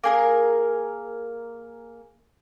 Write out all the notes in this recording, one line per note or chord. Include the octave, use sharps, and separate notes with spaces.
A#3 G#4 A#4